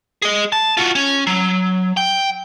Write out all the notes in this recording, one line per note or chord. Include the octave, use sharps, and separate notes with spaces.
G#4 D#5
A5
F4 F#4
C#4
F#3
G5